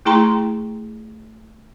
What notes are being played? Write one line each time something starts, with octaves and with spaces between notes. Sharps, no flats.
A3 E4 G#4 G5 A#5 C6